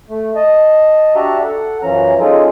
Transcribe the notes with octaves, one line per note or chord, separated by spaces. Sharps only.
A3
D#5 A5
D4 F#4 G4 E5 A5 A#5
A4 F#5
F#2 E3 F3 C#4 A#5
G#3 C#4 D#4 F4 G#4 A4